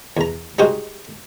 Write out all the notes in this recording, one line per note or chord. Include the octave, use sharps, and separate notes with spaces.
E2 A#5
G3 G#3 D#4 F#4 G4 C5